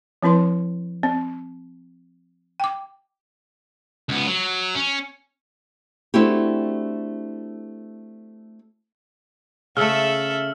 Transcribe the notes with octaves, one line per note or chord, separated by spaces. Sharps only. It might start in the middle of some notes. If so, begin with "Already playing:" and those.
F3 C4 E4 B4 C6
C4
G5 D6
C#2 B3
F#3
C#4
A3 C4 D4 E4 F#4 G4
C#3 A3 A4 E5 E6 F6